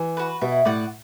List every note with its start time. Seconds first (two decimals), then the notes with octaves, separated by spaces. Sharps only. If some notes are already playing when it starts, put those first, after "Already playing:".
Already playing: E3
0.17 F#4 B4
0.41 B2 E4
0.65 A2 D5 F#5